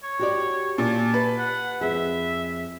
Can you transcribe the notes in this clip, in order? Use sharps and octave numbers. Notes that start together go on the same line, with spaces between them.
C#5
F#4 G4 D5
A#2 A5
B4
F#5
F2 G#4 E5